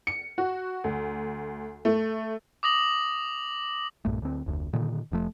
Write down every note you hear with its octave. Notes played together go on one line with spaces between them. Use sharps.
C#7
F#4
D2
A3
D6 D#6 A#6 F#7
B1 G2 A#2 A3
D2 C4
F1 D2
A#2 D3 D#3
F1 F3 A3